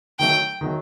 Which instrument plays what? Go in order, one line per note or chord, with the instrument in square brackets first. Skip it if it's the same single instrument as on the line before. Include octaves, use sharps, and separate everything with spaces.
[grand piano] D#3 F#3 A3 [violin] G5
[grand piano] D#3 F#3 A3